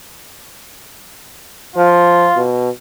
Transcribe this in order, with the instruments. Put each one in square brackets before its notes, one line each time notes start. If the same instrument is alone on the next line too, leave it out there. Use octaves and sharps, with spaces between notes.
[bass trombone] F3 [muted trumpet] F4
[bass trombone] B2